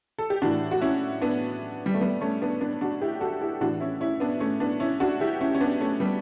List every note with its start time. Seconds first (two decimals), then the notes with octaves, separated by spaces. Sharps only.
0.18 A4
0.30 G4
0.42 A2 E3 D4 F#4
0.71 F#4
0.81 C#4 E4
1.22 B3 D4
1.86 G3
1.94 A3
2.01 G3 B3
2.21 A3 C#4
2.42 B3 D4
2.61 B3 D4
2.81 D4 F#4
3.01 E4 G4
3.21 F#4 A4
3.41 E4 G4
3.61 A2 E3 D4 F#4
3.80 C#4 E4
4.01 C#4 E4
4.20 B3 D4
4.40 A3 C#4
4.60 B3 D4
4.80 C#4 E4
5.00 D4 F#4
5.20 E4 G4
5.41 C#4 E4
5.55 C#4
5.60 B3 D4
5.80 A3 C#4
6.00 G3 B3